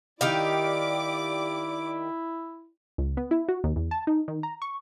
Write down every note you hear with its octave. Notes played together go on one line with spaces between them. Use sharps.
D#3 E4 G4 D5 F5 D6
C#2
B3
E4
F#4
D#2
E2
A5
D#4
D#3
A#5
C#6